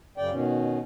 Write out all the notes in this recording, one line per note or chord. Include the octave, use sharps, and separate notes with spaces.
F#2 C#3 D5 G5
B2 D#3 C#4